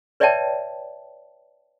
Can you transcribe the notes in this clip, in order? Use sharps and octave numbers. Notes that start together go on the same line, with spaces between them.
B4 C#5 D5 E5 G5 A5